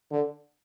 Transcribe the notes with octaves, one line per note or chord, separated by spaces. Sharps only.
D3